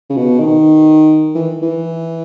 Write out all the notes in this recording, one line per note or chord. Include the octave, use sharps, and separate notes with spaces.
C#3
B2
D#3
E3
E3